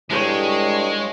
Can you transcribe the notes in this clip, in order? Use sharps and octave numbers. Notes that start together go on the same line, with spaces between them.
G2 G#3 E4 A4 C#5